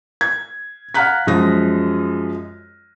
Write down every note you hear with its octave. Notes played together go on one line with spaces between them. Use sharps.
G#6
F5 F#5 A#5 F6 F#6 B6
F#2 F3 G#3 D#6 A#6